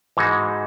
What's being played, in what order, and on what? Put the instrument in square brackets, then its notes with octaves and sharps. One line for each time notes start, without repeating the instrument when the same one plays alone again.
[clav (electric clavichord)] G#2 E3 G#3 D#4 F#4